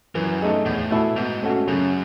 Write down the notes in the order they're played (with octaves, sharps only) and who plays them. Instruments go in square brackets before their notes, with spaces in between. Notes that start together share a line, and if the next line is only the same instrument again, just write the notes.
[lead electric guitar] F#2 [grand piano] E3
[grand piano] A3 D#4 G#4
[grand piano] E2 [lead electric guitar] A2
[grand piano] B2 A3 E4
[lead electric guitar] G#2 [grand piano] B2
[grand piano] A3 C#4 F#4
[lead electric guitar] F#2 [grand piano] C#3